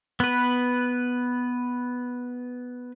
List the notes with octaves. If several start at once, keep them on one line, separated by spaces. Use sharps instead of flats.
B3 B4